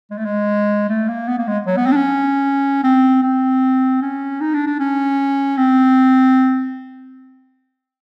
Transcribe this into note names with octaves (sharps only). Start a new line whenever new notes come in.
G#3
A3
G#3
A3
A#3
B3
A#3
G#3
F#3
B3
C4
D4
C#4
C4
C4
C#4
D#4
D4
D4
C#4
C4